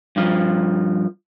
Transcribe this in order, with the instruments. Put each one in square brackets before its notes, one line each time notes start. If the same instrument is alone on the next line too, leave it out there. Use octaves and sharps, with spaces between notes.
[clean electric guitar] G2 F3